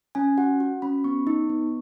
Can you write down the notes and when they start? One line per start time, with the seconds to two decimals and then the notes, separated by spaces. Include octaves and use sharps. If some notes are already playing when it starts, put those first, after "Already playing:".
0.15 C#4 G#5
0.38 F#4 F#5
0.60 F#4
0.82 C#4 B5
1.04 B3 C#6
1.27 D#4
1.50 B3